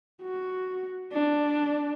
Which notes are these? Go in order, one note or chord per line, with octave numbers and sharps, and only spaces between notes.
F#4
D4